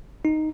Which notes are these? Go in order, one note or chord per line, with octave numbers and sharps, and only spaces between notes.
D#4